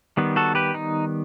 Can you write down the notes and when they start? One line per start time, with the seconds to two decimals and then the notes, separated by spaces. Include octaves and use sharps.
0.17 D#3 G3 B3
0.36 F#4 A4
0.55 G4 B4
0.74 D#4